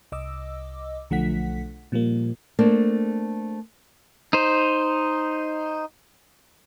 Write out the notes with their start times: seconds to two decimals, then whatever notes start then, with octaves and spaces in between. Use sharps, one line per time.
0.12 C2 D#5 D6 E6
1.10 B1 D3 F3 A3 F#5 B6
1.92 A#2 F3 G3 A#3
2.59 A3 A#3 C4 D4
4.33 D#4 C5